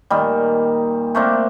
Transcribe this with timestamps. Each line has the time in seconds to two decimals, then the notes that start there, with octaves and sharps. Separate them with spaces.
0.10 A#2 D#3 G3
1.15 A3 A#3 C4 D4